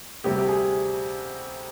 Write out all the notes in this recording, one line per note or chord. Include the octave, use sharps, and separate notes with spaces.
D2 C3 G3 C4 G4
G4
G#4